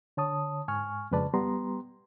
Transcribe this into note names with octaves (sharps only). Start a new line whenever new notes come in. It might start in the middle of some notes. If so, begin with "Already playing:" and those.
D3 C#5 A5 D#6
G#2 G#5 C#6 F6
F2 C#3 G#3 B4 D5 A5
G3 B3 G4 A#5 C6